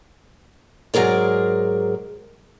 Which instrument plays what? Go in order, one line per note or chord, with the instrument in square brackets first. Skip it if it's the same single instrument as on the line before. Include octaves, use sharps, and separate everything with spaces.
[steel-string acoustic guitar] G#2 F#3 G#4 A#4 D5